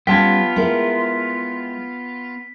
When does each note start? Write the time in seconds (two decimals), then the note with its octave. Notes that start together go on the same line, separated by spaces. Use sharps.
0.07 G3 B3 C#4 F4 G5 A5 G#6 B6
0.56 G#3 E4 A#4